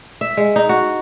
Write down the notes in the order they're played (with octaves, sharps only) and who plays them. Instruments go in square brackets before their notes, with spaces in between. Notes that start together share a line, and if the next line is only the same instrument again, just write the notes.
[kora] E5
G#3
D#4
F#4